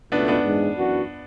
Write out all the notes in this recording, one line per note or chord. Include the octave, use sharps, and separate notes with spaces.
C#2 B2 A3 B3 D4
B3 D4
G#2 E3 G#3 D4
F#2 E3 B3 D4 F#4